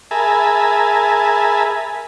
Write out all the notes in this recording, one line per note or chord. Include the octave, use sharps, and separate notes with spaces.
G#4 A#4 E5 G#5 A5 B5